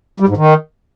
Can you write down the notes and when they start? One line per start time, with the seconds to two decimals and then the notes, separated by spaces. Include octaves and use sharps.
0.20 G3
0.28 G#2
0.37 D#3